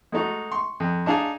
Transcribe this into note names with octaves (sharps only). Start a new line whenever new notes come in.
G#3 A3 D#4 F#4
C6 C#6
F2
D4 D#4 G#4 F5 A5